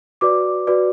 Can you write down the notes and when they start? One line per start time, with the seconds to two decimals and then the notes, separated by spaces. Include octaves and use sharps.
0.21 F#4 B4 D5 D6
0.67 F#4 B4 D5